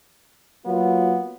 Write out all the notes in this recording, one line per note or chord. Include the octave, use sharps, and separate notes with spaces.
F#3 A#3 B3 F4